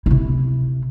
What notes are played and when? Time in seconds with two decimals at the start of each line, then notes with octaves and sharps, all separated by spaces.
0.06 C3 E4